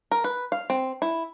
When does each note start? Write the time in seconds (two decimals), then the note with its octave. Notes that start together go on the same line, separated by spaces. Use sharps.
0.11 A#4
0.24 B4
0.52 F5
0.70 C4
1.02 E4